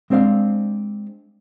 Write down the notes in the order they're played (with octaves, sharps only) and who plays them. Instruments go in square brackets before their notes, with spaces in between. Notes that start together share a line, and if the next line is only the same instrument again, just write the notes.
[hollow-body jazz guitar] G#3 C4 D4 C5 F5